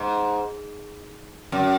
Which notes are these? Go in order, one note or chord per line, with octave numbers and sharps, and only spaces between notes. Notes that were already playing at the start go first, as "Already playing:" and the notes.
Already playing: G#2
F#2